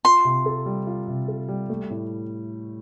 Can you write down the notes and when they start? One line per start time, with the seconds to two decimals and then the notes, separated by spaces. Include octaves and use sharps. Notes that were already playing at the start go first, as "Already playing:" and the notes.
0.05 F4 C6
0.25 C3
0.46 A4
0.66 G3
0.87 F4
1.08 C3
1.28 A4
1.49 G3
1.70 A3
1.90 A2